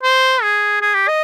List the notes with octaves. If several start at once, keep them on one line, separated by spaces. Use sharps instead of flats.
C5
G#4
G#4
G4
D#5